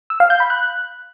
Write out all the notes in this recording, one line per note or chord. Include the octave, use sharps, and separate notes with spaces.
E6
F5
G6
B5
F#6